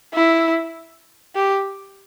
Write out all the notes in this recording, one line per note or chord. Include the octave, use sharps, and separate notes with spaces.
E4
G4